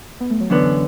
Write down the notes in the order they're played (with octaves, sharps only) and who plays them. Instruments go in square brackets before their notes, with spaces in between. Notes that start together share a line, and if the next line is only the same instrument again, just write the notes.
[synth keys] B3
A3
F#3
[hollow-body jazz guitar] F#2 D3 B3 [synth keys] E3